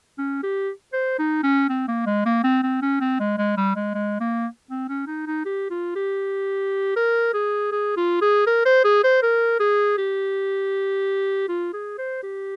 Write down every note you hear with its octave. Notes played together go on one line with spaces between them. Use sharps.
C#4
G4
C5
D#4
C#4
C4
A#3
G#3
A#3
C4
C4
C#4
C4
G#3
G#3
G3
G#3
G#3
A#3
C4
C#4
D#4
D#4
G4
F4
G4
A#4
G#4
G#4
F4
G#4
A#4
C5
G#4
C5
A#4
G#4
G4
F4
G#4
C5
G4